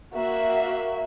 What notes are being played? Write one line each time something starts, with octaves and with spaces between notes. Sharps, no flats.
A#3 F#4 E5